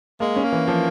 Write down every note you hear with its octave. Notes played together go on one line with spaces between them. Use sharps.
G#3 A#3
C#4
A#3
E3
F3